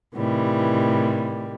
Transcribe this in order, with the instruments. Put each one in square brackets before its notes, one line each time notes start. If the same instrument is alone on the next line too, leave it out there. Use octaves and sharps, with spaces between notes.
[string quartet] A2 C3 D#3 E3 G3